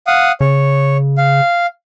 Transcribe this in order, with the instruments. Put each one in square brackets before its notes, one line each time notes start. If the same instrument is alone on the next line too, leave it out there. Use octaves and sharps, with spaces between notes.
[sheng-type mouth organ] F5 F#5 D#6
[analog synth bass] C#3 [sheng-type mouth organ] C#5
[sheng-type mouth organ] F5